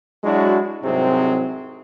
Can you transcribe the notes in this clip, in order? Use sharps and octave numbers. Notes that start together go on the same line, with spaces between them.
F#3 G#3 D4 E4 F#4
C2 G#2 C3 F#3 G#3 C4